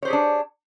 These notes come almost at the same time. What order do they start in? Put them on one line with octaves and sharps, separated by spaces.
C#5 C5 G4 G#4 D4